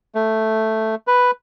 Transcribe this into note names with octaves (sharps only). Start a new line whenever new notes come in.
A3
B4